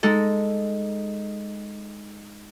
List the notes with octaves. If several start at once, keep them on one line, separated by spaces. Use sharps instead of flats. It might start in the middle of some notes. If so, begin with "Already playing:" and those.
G#3 D#4 A4